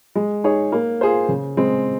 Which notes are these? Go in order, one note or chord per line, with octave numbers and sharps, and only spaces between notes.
G#3
D#4 G#4 C#5
A#3
F4 G#4 C5
C#3
G#3 C4